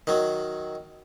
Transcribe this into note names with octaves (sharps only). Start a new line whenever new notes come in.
D#3 F#3